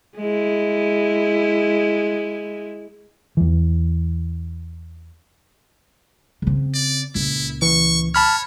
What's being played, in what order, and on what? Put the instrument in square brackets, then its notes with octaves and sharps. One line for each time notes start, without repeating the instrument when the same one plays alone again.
[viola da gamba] G#3 E4
[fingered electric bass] E2 E3
[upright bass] C#3 C4
[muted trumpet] D5
[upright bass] C#2 A#2 [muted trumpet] E4
[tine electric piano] E3 [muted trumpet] C#6
[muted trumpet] C#5 [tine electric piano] A5 B5 F6